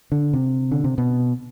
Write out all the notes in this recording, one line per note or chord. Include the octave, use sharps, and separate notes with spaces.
D3
C3
D3
C3
B2